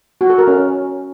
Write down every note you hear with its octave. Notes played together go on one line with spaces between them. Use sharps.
F#4
A4
A#4
C#4